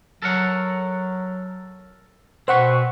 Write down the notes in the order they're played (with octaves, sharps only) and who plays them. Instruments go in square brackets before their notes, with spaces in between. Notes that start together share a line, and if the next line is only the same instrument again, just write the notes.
[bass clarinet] F#3 [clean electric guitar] A4 A#4 F#5
[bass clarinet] B2 [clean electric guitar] C4 B4 [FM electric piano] C5 F#5 C#6